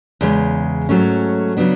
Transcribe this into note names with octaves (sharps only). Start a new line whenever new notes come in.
E2 C#3 G#3
G#2 F#3 A3 C#4
C#3 F#3 B3 D4